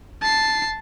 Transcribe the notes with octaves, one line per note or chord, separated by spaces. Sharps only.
A5 C7